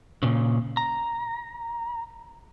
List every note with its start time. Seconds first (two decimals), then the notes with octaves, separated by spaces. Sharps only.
0.23 A#2 C#3
0.77 A#5